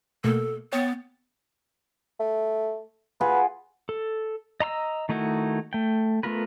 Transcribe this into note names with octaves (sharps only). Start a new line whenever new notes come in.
B2 A3 A#3 A4
B3 C#5 G5 A6
A3
F4 G#4 B4 F#5
A4
D#5 A#5 C6 E6
D#3 A3 D#4 E4 F#4
A3 G5
A3 B3 F4 A#4 B4